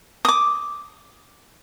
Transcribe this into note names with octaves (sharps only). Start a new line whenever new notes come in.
D6 D#6